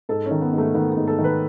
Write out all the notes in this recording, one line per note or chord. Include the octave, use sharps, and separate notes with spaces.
G#2 A4
C#4
D#3
B3
G#2
A3
D#3 B3
B3
G#2
A4
D#3
B4